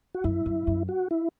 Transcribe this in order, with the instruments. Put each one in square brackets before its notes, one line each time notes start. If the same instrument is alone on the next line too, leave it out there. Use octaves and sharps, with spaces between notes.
[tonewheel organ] F#4
[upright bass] F#2 [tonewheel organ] E4
[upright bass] F#2
F#2
[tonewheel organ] F#4
E4